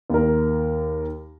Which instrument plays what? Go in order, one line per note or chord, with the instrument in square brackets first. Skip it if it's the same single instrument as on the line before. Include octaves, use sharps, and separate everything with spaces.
[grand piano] D#2 A#4